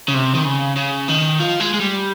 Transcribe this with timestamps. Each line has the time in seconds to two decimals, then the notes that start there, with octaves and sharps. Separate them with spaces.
0.08 C#3
0.14 C3
0.35 D#3
0.45 C#3
0.76 C#3
1.08 D#3
1.39 F3
1.60 G#3
1.74 G#3
1.80 G3